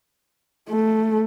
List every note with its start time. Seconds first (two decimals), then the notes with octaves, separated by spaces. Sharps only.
0.70 A3